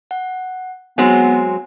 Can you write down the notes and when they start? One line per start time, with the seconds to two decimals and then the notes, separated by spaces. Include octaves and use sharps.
0.11 F#5
0.98 F#3 G#3 B3 C4 G#5